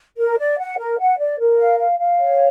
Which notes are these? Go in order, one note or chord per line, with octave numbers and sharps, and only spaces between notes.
A#4
D5
F#5
A#4
F#5
D5
A#4
F5
F5
F5
C#5